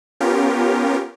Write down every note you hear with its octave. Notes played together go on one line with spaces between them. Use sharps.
B3 C#4 F4 G4 A#4